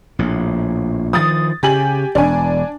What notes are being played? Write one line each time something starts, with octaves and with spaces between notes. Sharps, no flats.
A#1 A2
D#3 F3 D#6 A6
C#3 G4 G#5 F#7
E1 D4 G#5